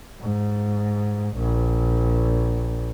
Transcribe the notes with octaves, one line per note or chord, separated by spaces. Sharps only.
G#2
A#1